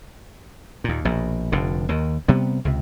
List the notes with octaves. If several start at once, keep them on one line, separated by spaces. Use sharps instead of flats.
D#2 A#2
A#1 B2
F1 F2 D3
D#2 D#3
C3 G3 B3
C#2 C3